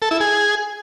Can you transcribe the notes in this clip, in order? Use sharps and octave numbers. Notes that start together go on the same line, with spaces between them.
A4
E4
G#4